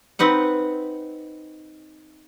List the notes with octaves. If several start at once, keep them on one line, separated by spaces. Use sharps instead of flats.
C4 D#4 B4 F#5